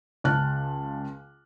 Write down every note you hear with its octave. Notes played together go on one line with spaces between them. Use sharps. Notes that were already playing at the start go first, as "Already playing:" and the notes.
C#2 C#3 A5 F6 F#6